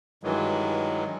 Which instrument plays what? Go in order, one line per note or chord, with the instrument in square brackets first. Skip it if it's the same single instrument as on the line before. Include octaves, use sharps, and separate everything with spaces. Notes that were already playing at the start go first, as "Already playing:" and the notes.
[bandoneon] G2 D#3 E3 F#3 G#3